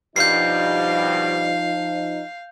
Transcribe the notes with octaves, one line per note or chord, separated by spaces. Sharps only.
G2 B2 F3 G3 D#4 F5 G6 C7